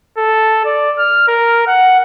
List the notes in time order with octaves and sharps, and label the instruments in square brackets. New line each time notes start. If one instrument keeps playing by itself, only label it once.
[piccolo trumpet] A4
D5
F6
A#4
F#5